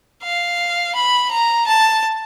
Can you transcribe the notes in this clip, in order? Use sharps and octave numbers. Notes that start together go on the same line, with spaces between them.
F5
B5
A#5
A5